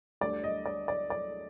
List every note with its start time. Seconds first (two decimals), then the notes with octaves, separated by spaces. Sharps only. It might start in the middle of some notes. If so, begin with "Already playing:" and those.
0.21 D2 D3 G3 D5
0.44 D#5
0.66 D5
0.88 D5
1.10 D5